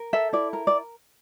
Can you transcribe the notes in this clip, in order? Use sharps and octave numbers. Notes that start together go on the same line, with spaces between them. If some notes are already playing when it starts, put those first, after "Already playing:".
Already playing: A#4
A4 E5
E4 D5
A#4
D5